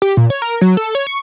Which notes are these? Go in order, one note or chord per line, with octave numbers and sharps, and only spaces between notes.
G4
A#2
C#5
A#4
F#3
A4
C#5
C#6